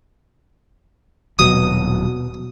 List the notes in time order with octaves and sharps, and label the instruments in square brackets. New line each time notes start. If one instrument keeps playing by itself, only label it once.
[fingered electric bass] D#1 F#3 [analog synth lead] B2 [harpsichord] D#6